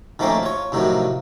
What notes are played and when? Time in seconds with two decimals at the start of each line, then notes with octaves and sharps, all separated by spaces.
0.19 D#3 F3 A3 A#3 C4 C#4
0.43 F4 C#5
0.72 A2 C3 D#3 F3 F#3